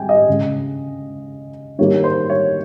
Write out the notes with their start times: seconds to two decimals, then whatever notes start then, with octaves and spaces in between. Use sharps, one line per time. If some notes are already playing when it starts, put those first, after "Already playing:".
Already playing: G5 G#5
0.09 D#5
0.28 C#3 G#3
1.79 D#3 G3 A#3 C#5
2.04 C5
2.30 C#5